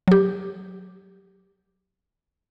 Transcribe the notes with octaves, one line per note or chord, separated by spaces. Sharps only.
F#3 G4